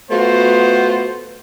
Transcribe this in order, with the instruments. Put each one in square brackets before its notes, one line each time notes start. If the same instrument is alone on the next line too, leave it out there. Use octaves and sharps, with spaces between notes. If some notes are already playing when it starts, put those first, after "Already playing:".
[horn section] A3 B3 F4 F#4 C5